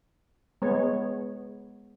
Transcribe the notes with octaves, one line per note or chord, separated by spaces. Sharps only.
G#3 B3 C#5